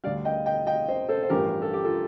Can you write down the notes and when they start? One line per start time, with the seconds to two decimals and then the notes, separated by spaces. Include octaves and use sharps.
0.04 D2 D3 G3 D5 F5
0.25 D#5 G5
0.46 D#5 G5
0.67 D#5 G5
0.88 C5 D#5
1.09 A4 C5
1.23 C5
1.30 A1 G2 F3 A3 G4 A#4
1.62 A4
1.73 G4
1.84 F4 A4